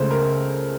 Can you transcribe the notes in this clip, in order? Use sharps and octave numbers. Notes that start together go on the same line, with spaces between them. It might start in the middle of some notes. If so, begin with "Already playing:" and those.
Already playing: C#2 C#3 A3 C5
A#4